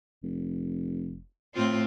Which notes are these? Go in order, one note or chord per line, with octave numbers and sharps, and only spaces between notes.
F1
A2 C4 F4